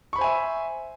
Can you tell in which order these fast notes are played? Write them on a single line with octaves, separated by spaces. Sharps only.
C#6 B5 C5 G#5 E5